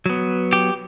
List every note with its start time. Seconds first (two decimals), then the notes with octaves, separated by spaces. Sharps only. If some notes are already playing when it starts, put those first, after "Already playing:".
0.06 F#3 B3
0.53 G4